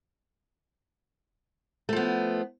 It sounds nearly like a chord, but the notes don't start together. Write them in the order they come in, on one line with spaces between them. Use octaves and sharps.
A3 F3 B3